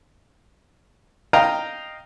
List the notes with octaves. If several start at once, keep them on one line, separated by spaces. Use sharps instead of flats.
D#5 F5 G5 A#5 D#6 F6